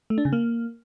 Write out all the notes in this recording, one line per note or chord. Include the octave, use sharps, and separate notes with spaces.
A3
D4
C#3
A#3